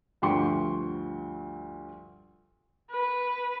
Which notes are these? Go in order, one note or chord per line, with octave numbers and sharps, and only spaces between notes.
D2 G2 F3 G5 C6 C#6
B4